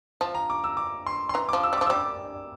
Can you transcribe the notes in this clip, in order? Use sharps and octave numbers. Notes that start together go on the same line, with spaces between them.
F3 A5
A#5
D6
E6
D6
C6
C6
E3 A#5
D6
F3
E6
G3
D6
F3
E6
G3 D6